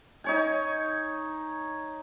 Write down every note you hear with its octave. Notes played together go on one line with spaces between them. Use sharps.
D#4 C#5 G#5